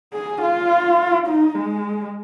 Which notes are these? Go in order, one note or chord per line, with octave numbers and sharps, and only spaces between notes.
G#4
F4
D#4
G#3